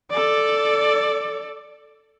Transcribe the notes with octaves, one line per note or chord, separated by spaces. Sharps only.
A4 D5